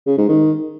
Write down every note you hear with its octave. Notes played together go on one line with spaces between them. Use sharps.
C#3
G#2
D#3